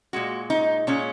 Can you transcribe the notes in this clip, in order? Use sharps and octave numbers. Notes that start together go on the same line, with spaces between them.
A#2 G#3 F#4
D#4
A#2 G#3 C#4